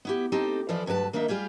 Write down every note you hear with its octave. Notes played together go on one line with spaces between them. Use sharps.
B3 E4 G4
C4 D#4 G4 A4
E3 F3 E4 F4 A4 D5
D2 G2 F#3 B4 A5
D#3 A#3 D4 D#4 E5
G3 F4 G4 G#4